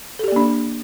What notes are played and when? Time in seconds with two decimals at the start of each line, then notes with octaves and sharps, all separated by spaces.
0.19 A4
0.24 G4
0.28 D5
0.32 A#3
0.36 D4